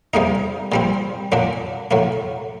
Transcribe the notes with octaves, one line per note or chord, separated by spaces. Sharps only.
C3 G3 A#3 D#4
A#2 G3 C4
A#2 F#3 A#3 D4
A2 F#3 A#3